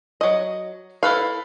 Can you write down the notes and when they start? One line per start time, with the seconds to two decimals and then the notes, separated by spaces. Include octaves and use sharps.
0.21 F#3 D#5
1.03 E4 A4 B4 F5